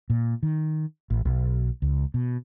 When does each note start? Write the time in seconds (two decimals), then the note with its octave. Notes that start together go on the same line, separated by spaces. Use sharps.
0.10 A#2
0.43 D#3
1.10 A1
1.25 B1
1.82 C#2
2.14 B2